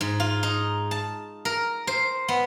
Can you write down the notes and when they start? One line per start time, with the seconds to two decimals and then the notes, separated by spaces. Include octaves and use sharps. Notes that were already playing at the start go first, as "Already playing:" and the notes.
0.01 G#2
0.20 F4
0.43 D#4
0.91 A5
1.45 A#4
1.87 C5
2.28 B3